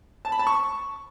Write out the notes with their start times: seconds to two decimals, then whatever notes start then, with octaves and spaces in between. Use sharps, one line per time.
0.25 A5
0.32 B5
0.39 A5
0.47 C#6